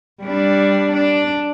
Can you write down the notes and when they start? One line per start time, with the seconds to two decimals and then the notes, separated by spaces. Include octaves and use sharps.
0.22 G3 D4
0.92 D4